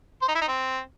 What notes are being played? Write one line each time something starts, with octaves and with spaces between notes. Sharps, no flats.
C5
D#4
E4
D#4
C4